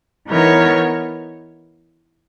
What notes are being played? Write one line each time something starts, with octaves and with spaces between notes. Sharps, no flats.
E3 B3 D#4 A#4 C#5